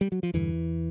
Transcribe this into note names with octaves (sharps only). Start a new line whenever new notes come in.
G3
F#3
F3
E2 G2 D3 E3